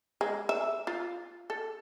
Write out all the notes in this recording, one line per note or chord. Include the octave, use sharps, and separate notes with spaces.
G#3
E5
F4
A4